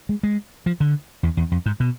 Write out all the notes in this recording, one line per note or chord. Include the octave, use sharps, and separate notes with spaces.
G#3
G#3
F3
D3
E2
E2
F2
G#2
B2